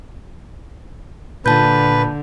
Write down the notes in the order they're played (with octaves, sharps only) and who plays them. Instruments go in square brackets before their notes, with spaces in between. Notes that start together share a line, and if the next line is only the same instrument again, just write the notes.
[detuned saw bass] A#2 [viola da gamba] D3 [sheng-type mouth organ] B4 [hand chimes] A5 G6